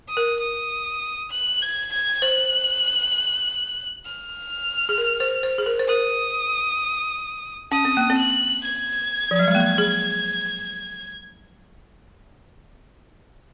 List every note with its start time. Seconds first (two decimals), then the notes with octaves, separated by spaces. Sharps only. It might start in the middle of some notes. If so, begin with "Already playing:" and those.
0.09 D#6
0.17 A#4
0.40 D#6
1.31 F#6
1.62 G#6
1.93 G#6
2.22 C5 F#6
4.06 F6
4.89 G#4
4.98 A#4
5.20 C5
5.43 C5
5.58 G#4
5.66 A#4
5.79 C5
5.89 A#4 D#6
7.71 C#4 D#6
7.85 C4
7.97 A#3
8.10 C4
8.18 F#6
8.64 G#6
9.31 F3
9.39 F#3
9.48 G#3
9.55 A#3
9.78 G#4